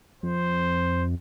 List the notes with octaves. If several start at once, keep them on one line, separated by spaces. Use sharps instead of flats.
F2 C5